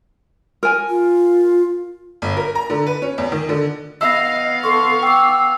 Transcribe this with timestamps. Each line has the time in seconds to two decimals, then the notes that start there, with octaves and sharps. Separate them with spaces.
0.63 A#4 G#5
0.90 F4
2.22 G1
2.37 A#4
2.55 A#5
2.70 D3
2.86 B4
3.02 C#4
3.18 E2
3.32 D#3
3.49 D3
4.01 B3 D#5 F5 E6 A#6
4.63 A4 C6 C#6
5.03 G5 D6 E6